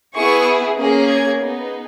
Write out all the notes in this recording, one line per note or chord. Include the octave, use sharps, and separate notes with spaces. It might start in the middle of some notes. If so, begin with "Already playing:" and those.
B3 E4 G#4 C#6
A#3 C#4 G#4
G#6
B3 D#4 G#4